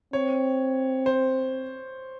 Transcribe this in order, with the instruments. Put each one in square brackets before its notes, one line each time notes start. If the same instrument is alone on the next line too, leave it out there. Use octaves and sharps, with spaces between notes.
[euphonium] C4 [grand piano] C#5
[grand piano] C5